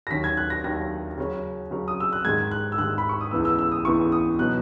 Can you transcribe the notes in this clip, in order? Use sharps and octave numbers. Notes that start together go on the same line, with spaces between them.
A#6
D#2 D#3 F#3 C#4 B6
G#6
F#6
A#6
D#2 D#3 F#3 C#4 A#6
C#3 F#3 C#4
C#3 F#3 C#4
D#6
E6
F#6
G#2 D#3 G#3 G#6
F#6
E6
G#2 D#3 G#3 F#6
B5
C#6
D#6
C#2 C#3 E3 B3 E6
E6
E6
D#6
C#2 C#3 E3 B3 C#6
D#6
B2 F#3 B3 D#4 F#6